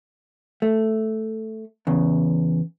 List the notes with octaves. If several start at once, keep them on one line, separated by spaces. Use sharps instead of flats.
A3
E2 C#3